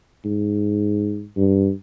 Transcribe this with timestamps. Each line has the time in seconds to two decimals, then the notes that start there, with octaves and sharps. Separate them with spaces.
0.25 G#2
1.37 G2